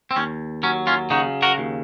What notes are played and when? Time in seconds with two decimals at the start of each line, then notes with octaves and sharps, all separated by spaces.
0.11 C4
0.16 D#2 C#4
0.63 F#3 C#4
0.87 C#4 F4
1.10 C#3 D#4 F#4
1.42 F#4 A#4
1.58 D#2